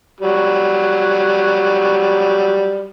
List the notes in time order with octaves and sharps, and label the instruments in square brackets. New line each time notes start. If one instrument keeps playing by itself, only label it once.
[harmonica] F#3 G3